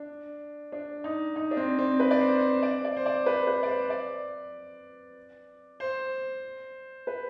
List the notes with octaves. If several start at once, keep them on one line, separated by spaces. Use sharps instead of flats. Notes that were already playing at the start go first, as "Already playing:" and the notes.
Already playing: D4
D4
D#4
D#4
D4
C4
C4
B4
D5
C5
C5
D5
D5
C5
D5
B4
B4
D5
C5
D5
C5
B4